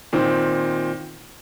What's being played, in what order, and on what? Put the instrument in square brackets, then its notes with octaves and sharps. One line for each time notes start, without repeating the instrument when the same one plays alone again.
[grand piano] A#2 D#3 C4